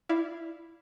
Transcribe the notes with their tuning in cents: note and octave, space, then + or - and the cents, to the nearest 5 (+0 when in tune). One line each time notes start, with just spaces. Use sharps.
E4 +0 D5 +0 F5 -15